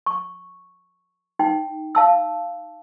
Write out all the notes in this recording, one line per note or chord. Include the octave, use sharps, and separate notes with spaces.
C#6
D#4 G5
F5 A5 E6